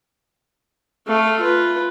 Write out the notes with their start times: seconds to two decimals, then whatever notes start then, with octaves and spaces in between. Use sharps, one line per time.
1.07 A3 F5
1.40 F4 B4